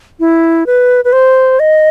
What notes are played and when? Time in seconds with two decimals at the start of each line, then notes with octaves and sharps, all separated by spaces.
0.20 E4
0.66 B4
1.05 B4
1.13 C5
1.60 D#5